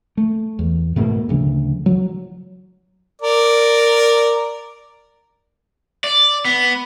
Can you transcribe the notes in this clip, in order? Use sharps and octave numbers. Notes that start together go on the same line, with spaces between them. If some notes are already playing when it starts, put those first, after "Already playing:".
A3
E2
G#2 B2 A3 A#3
D2 C#3 F3
F#3
A#4 D5
D5
B3